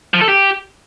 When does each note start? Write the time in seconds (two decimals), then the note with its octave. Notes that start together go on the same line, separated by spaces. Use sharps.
0.14 F3
0.21 A4
0.28 G4